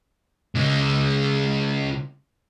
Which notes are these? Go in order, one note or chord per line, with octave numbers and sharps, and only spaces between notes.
C#3 G#3